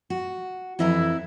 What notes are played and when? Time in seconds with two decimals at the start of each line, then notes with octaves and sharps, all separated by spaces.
0.10 F#4
0.79 F2 E3 E4 A#5